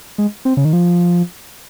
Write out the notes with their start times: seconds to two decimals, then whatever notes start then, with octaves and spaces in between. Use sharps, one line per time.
0.18 G#3
0.45 C4
0.57 C#3
0.65 D#3
0.73 F3